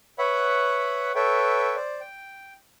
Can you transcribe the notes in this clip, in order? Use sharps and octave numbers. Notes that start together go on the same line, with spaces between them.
B4 C#5 E5 F#5 B5
A4 B4 C#5 E5 G5
C5 D5
G5